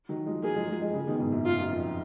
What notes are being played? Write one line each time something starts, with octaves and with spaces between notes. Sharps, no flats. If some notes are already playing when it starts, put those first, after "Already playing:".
D#3 F#3
F3 G#3
F#3 A#3 G#4
F3 G#3
F3 G#3
F3 G#3
C#3 F3
B2 D#3
G#2 B2
F#2 A#2
F#2 F4
F#2
F2